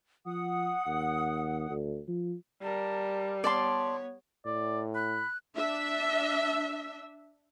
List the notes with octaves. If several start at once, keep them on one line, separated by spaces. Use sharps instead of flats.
F3 F#5 D#6
D#2
D2
F3
G3 A#4 A5
B3 C#5 D5 A5 C6
A2 D5
B5 F#6
D4 E5